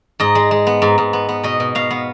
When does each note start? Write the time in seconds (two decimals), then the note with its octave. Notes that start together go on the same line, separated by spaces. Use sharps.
0.20 G#2 D#5
0.35 G#3
0.51 G#3
0.67 B3
0.82 G#2
0.98 G#2
1.13 B3
1.29 B3
1.44 B2 D#5
1.60 B2
1.75 B2 F5
1.91 B3